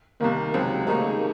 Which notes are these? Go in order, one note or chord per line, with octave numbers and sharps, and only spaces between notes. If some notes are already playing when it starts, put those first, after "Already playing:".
C2 C3 D#3 A#3
C#2 C3 F#3 C4
D#2 C#3 A3 A#3 D#4